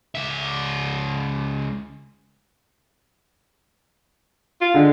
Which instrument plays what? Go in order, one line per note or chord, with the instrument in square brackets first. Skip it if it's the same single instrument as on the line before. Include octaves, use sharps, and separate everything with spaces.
[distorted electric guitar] C#2 E5
[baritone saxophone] F4
[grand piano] D3 [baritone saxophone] G#3